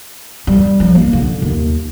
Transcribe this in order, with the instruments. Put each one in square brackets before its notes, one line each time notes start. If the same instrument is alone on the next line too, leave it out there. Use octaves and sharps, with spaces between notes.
[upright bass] G3
F3
A#3
D3
D#2